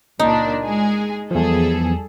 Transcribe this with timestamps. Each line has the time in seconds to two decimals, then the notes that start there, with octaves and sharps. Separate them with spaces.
0.19 C#2 A#2 D4 D#4
0.63 G#3 G#4
1.31 E2 F3 G3 G#4 A4